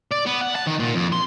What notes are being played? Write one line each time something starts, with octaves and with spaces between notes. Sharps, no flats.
D5
B3
F#5
A5
D#3
A#2
F2
C6